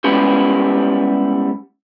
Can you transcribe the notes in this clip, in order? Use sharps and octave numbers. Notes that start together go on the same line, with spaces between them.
G3 G#3 B3 C#4 E4 G4